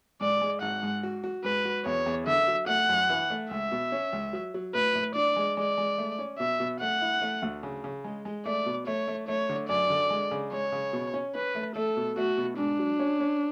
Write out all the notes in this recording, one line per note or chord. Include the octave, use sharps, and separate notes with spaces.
G#2 D5
G#3
G#1 F#5
G#2
F#4
F#4
G#2 B4
F#4
E2 C#5
E2
D3 E5
F#3
A3 F#5
F#2
E3
A3
C#2 E5
B2
C#4
C#2
F#3
F#3
A2 B4
A2
D4 D5
G#3
G#3 D5
G#3
A3
C#4
B2 E5
B2
A3 F#5
E4
A3
D2
C#3
C#3
G#3
G#3
A3 D5
B2
A3 C#5
A3
A3 C#5
D3
F#2 D5
D3
G#3
C#3
G#3 C#5
C#3
B2
C#4
C#4 B4
A3
A3 A4
B2
A3 F#4
B2
G#2 D4
F#3
C#4
C#4